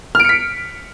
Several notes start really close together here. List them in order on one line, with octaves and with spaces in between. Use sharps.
F6 D7 C#7 B6